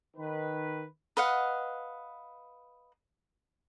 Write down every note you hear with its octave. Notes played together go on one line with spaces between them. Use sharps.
D#3 B4
B4 D#5 F5 F#5